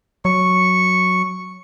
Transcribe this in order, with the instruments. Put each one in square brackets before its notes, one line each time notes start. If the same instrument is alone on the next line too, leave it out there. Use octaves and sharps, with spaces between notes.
[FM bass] F#3 [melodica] C#6